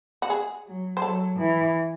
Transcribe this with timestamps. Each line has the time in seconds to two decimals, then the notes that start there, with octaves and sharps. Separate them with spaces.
0.22 F#4
0.30 G#4
0.66 F#3
0.97 C5
1.02 F#3 A4
1.38 E3